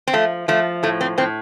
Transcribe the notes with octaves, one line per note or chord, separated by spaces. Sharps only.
C4
F3 A3
F3 A3
A2 A3
C4
A2 C4